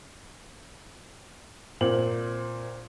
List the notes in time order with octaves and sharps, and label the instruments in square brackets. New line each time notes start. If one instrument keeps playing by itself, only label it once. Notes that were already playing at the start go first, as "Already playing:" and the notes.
[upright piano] A#2 C4 F#7